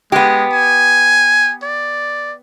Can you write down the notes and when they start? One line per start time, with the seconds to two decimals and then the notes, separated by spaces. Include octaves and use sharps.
0.12 G#3 B3 G4
0.53 G#5
1.63 D5